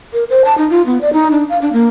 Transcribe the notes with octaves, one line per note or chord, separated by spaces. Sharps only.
A#4
C5
A5
D#4
F4
B3
D5
D#4
D4
F5
D4
A#3